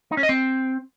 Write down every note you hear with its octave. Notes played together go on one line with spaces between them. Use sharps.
D#4
C#4
D#5
C4